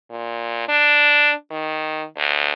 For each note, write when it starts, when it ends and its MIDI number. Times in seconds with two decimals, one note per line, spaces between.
0.10 0.68 46
0.68 1.32 62
1.51 2.04 51
2.17 2.53 38